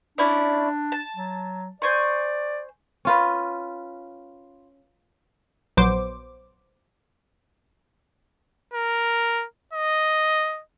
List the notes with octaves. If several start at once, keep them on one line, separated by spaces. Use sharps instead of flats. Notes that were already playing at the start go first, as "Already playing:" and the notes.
C#4 D4 E4 D5
A5
F#3
C5 D5 G#5 C#6
C#4 F4 B4
A#1 F#3 B3 C5 D6
A#4
D#5